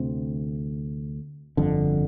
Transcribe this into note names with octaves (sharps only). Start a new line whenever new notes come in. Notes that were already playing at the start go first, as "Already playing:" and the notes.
Already playing: D2 C3 C4
G1 F2 D3